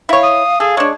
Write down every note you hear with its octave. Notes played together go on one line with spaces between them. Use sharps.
E4 C#5 F5
D#6
G#4 A4
G#3 D4 C#5